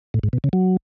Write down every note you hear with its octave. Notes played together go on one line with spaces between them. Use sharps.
A2
G#2
B2
C#3
F#3